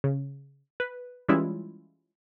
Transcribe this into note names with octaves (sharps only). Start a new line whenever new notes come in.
C#3
B4
E3 G3 G#3 C#4 E4 F4